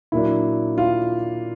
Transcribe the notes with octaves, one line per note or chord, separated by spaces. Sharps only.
A#2 F#3 A#3 D4 E4
F4